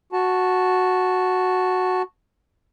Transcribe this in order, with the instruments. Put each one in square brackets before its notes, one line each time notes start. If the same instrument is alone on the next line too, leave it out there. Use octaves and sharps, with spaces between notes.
[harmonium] F#4 A5